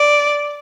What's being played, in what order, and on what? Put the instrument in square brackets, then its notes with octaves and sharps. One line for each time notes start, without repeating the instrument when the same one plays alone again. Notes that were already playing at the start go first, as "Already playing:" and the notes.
Already playing: [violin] D5